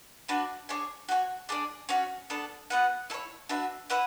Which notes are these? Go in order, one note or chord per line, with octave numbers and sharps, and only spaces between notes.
D4 F#4 B4
D4 G#4 C#5 G#5
F#4 C#5 G#5
D4 G#4 D5
C#4 F#4 C#5
B3 D4 A4
B3 F#4 B4 F#5
E4 A4 C#5
D4 F#4 B4 E5
E4 B4 F#5